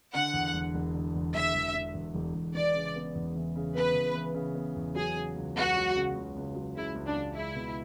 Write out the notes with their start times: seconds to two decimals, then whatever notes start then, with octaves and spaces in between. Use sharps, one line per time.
0.14 D3 F#5
0.34 E2
0.54 E1
0.74 E1
0.95 D3
1.15 E2
1.34 E1 E5
1.54 E1
1.74 D3
1.95 E2
2.15 E1
2.35 E1
2.54 E3 D5
2.75 C#3
2.96 B3
3.15 E2
3.36 E3
3.56 C#3
3.75 B3 B4
3.95 E2
4.15 E3
4.35 C#3
4.55 B3
4.76 E2
4.95 F#3 G#4
5.16 C#3
5.36 C#2
5.55 C#2 F#4
5.76 F#3
5.96 C#3
6.15 C#2
6.36 C#2
6.55 F#3
6.76 C#3 E4
6.95 C#2
7.07 D4
7.16 C#2
7.36 G#3 E4
7.56 B2